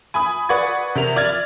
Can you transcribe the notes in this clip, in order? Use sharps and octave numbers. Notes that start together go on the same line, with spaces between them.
G#5 B5 D#6
B4 D5 F#5 C#6 G#6
C3 A#4 F7
D5 F6 G#6 A6